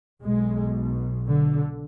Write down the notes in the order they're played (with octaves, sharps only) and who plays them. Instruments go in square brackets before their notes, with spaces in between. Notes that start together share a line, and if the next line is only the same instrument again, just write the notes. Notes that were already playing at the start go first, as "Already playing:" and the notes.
[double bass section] B1 B2 G#3
D3